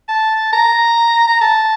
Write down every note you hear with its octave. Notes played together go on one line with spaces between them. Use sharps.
A5
A#5
A#5
A5